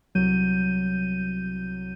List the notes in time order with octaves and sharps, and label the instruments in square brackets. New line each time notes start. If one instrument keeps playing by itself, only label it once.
[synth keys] C2 F#3 G6 D#7